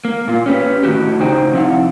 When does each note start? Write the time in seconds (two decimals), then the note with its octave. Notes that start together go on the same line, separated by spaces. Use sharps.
0.05 A#3
0.28 A#2 F4
0.46 C#4 G4 B4
0.83 A2 D#3 F3 F#4 G4
1.20 C#3 D#4 C5 G5
1.53 C3 F3 E4 F5 F#5